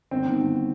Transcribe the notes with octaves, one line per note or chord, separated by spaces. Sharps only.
G1 C4
D#3
G1